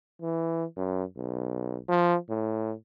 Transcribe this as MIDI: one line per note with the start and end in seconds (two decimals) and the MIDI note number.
0.22 0.65 52
0.77 1.04 42
1.17 1.78 35
1.89 2.16 53
2.29 2.73 45